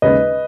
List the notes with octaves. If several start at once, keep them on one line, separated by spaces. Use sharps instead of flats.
D#2 C#3 G#3 B4 D#5